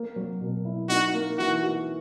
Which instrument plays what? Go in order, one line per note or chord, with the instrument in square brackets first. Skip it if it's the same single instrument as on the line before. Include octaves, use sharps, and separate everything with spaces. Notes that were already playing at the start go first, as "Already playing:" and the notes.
Already playing: [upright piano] A#3
F#3
B2
E4
[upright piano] D#4 [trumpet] F#4
[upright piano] A#3
[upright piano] E3 [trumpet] F#4
[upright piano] F#4